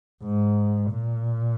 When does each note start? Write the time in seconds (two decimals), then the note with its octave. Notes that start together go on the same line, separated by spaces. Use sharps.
0.24 G#2
0.92 A#2